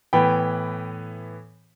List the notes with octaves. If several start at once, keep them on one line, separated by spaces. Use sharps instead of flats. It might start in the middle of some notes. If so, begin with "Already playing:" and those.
A2 E3 B3 G5 B5